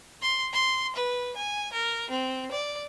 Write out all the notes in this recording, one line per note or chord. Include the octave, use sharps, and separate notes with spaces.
C6
C6
B4
G#5
A#4
C4
D5